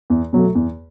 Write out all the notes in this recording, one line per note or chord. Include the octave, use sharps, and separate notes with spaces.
E2
B2 F#3 A3
E2